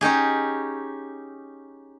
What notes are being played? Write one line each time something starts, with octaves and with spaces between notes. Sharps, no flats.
C#4 D#4 G4 G#4